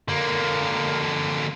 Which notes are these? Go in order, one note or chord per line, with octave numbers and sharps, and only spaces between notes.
D3 A#3